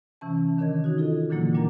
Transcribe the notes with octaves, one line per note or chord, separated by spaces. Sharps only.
C3 E3 C#4 A5
D#3 D4 A#4 C#5 D#5 G#6
D#4 F#4
F4 A4 D#5
A#2 D3 E3 F#3 A#3 E4
A#2 F#3 G3 D4 A#4 A#5